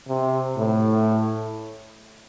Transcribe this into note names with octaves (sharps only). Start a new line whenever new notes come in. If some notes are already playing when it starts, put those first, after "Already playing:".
C3
A2